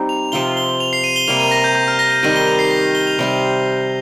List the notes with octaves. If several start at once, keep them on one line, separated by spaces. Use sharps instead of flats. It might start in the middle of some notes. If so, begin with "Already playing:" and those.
Already playing: G3 C4 D#4 G4
F7
C3 F3 C4 F4 G7
G7
F7
C7
D#7
G7
C3 G3 A#3 F7
D#7
A#6
G6
G6
F6
A#6
D#7
D#3 G3 C4 G4 D#7
G7
F7
C7
A#6
A#6
G7
F7
C3 G3 C4